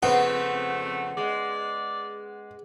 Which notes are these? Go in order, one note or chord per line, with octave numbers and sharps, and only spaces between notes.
F2 C#3 A3 B3 C4 F#5
G#3 D5